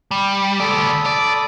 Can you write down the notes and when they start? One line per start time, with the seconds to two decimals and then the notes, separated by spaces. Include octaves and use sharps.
0.11 G3
0.60 D2 A4 D5 B5 D#6
1.06 D5